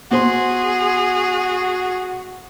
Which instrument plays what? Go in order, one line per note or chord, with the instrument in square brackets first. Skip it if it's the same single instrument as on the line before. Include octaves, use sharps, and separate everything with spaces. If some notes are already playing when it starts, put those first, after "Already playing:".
[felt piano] B3 C5 C6 [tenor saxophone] F#4 [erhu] G#4